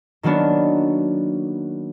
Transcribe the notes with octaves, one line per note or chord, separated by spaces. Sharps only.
D#3 F#3 A#3 B3 D4